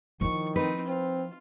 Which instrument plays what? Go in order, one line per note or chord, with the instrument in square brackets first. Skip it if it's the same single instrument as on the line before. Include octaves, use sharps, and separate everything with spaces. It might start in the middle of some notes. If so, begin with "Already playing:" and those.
[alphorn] D#3 [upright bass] F3 E4 [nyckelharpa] C#6
[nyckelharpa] C4 D#4 [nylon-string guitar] B4
[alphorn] C4 [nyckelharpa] F4